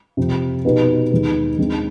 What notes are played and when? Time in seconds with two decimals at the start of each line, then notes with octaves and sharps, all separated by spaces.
0.17 F2 C3 F3
0.65 B2 B3 D#4 G4 B4
1.12 D#2 D#3 G#3 B3
1.58 D#2 D3 G#3 C4 D#4